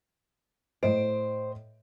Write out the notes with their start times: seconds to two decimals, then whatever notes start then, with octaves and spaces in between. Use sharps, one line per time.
0.83 A2 C5 D#5 D7